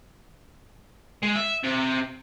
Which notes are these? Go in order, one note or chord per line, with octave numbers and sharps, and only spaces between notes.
G#3
E5
C3